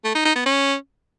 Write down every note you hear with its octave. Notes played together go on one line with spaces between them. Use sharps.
A3
D#4
D#4
B3
C#4